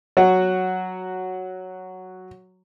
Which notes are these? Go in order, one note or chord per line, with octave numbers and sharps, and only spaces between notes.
F#3 F#4